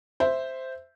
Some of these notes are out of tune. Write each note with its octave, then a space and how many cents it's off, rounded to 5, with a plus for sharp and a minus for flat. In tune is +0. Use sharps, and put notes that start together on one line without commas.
C5 -5 E5 +0